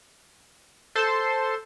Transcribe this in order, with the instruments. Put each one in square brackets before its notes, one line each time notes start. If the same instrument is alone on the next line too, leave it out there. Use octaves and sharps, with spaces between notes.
[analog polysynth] A4 C5 A5 C6